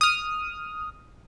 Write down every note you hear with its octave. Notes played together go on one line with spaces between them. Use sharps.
D#6 F6